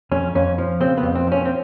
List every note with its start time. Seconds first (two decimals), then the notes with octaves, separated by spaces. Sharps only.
0.12 F2 C#4
0.35 F2 C#4
0.58 F3
0.81 C#3 C4
0.97 B3
1.03 F2
1.15 C4
1.27 F3 C#4
1.45 C4